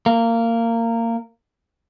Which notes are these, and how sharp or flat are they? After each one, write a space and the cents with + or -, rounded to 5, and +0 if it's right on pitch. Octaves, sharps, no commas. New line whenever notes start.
A#3 -20